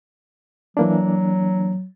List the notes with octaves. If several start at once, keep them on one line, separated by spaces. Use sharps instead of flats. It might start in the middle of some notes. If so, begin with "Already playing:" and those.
E3 F#3 A#3 D4